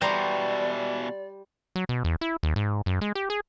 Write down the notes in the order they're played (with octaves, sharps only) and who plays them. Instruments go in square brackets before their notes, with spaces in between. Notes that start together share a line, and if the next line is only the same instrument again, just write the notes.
[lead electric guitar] B2 E3 [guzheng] G3 C5 A#5 [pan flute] D5
[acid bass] F#3
B2
E2
E4
D#2
G#2
F#2
G#3
G4
G#4